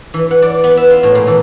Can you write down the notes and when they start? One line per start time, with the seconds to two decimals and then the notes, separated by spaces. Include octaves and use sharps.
0.14 E3
0.31 F#5
0.42 D5
0.64 B3
0.77 E5
0.90 F4
1.03 A2
1.15 A#2
1.27 E3